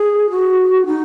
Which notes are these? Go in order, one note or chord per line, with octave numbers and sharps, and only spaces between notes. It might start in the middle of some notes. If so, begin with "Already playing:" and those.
Already playing: G#4
F#4
D#4